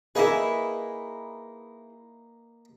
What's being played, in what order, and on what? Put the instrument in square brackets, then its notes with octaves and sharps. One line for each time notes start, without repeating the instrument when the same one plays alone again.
[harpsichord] A#3 D#4 B4 [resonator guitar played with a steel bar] E4 G#4